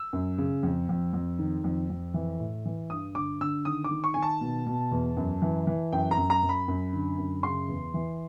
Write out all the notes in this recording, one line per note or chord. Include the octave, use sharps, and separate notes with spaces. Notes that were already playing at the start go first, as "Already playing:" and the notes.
Already playing: E6
F#2
C#3
F2
F2
F2
D#3
F2
F2
E3
A2
E3
G2 D#6
D3 D6
D3 E6
D#3 D#6
D6
D#3
C#6
D#3 G#5
A5
B2
B2
E2
F#2
E3
E3
F#2 G5
A#5
F#2
A#5
F#2
B5
F#2
D3
F#2
C#3 C6
E2
E3